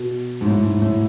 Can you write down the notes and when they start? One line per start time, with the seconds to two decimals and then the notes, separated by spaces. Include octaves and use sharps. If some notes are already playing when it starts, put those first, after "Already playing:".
Already playing: B2
0.41 G#2
0.46 A2
0.64 G#2
0.82 A2